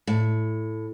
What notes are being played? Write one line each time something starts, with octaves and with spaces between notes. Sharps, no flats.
A2